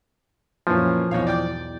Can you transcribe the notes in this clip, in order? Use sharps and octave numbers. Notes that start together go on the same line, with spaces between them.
F#2 A#2 E3 F3 A#3 C#4
B1 E2 G#2 C#5 F5
D5 G5 D6